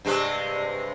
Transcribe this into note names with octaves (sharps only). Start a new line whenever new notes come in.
G2 C3 G#3